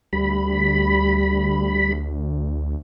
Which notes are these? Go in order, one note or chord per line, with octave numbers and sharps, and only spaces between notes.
D2 G3 B5